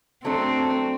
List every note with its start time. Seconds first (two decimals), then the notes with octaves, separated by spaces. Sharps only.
0.25 F#3 A3 C4 D4 A4